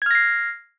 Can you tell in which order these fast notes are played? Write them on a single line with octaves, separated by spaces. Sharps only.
G#6 F6 A#6 C7